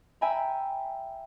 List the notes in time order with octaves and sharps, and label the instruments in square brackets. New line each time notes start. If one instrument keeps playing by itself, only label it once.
[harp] E5 G5 G#5 A#5 B5